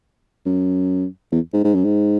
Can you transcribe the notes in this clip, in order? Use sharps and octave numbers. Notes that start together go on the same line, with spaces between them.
F#2
E2
G#2
G#2
F#2
G#2